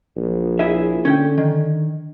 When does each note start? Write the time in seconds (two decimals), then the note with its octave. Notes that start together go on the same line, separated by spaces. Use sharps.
0.16 A#1
0.59 E4 G#4 E5
1.05 D3 C#4 G5
1.38 D#3